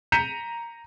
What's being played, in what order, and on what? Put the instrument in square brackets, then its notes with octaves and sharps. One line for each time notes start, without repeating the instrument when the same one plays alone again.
[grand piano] A#5 G6 B6 C#7 D#7 E7